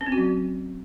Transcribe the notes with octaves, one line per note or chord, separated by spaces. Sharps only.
C#4
C4
F#4
F#3